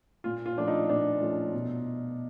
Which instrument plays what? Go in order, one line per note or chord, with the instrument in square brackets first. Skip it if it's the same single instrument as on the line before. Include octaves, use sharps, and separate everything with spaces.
[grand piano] A#2 [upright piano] F4
[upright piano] F4
[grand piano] F3 A3 C#4 [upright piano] D4
[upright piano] D#4
[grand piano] A#2 [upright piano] D4
[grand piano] F3 A3 C#4
B2